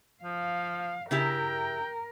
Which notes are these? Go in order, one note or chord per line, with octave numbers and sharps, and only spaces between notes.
F3 F5
C#3 E4 G4 A#4 G5